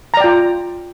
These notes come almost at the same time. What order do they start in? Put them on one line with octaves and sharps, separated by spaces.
A#5 D5 G5 F4